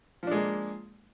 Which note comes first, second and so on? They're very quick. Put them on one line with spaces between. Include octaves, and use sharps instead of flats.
F3 D4 G#3 A#3